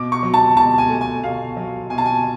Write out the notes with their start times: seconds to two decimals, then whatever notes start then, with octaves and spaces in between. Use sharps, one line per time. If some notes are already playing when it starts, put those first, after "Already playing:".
Already playing: B2 D6
0.12 C#6
0.23 F#3
0.34 A5
0.57 B2 A5
0.78 G#5
0.89 A3
1.01 G#5
1.23 B2 F5
1.57 F#3
1.90 B2 G#5
1.98 A5
2.06 G#5